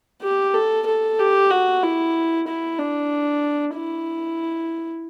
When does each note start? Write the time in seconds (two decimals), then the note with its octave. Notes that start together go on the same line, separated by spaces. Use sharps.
0.22 G4
0.54 A4
0.86 A4
1.19 G4
1.50 F#4
1.83 E4
2.47 E4
2.78 D4
3.75 E4